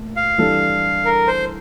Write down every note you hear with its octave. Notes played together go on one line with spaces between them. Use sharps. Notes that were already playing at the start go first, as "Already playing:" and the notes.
Already playing: A#2 A3
F5
E3 G3 D4 A4
A#4
C5